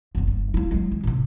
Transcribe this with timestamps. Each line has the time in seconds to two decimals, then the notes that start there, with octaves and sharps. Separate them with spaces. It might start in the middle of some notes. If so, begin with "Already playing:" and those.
0.15 F#1 B3
0.27 G2
0.54 A#3 E4
0.71 F#3 G#3
0.91 E3 G#3
1.04 A2 C3